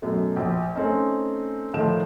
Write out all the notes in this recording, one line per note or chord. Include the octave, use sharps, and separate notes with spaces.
F#2 B2 A3
A#1
A3 C4 C#4 D#4
A2 D#3 F3 A3 F5 E7